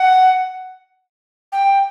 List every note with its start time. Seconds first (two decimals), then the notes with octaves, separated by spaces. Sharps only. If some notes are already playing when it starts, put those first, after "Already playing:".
Already playing: F#5
1.52 G5